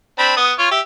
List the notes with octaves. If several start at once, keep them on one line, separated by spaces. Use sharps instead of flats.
C4 D4 B5
B3 D#6
F4 C#5
G4 E5